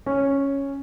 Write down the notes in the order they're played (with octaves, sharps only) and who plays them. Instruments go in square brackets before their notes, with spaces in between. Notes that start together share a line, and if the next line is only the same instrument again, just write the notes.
[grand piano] C#4